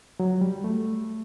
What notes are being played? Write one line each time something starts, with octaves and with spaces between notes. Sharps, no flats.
F#3
G3
A3